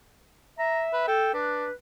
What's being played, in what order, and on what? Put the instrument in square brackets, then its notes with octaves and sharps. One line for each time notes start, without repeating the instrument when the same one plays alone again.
[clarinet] E5 [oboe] A#5
[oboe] B4
[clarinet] A4 [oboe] G5
[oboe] D4 [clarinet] B4